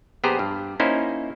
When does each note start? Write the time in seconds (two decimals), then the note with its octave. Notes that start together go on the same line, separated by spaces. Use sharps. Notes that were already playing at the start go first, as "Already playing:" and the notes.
0.23 A#1 B3 G4 G#4 C5 A#5
0.39 G2
0.80 A#3 C#4 D#4 E4 C5